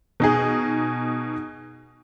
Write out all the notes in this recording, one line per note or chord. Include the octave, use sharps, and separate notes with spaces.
B2 D#4 G#4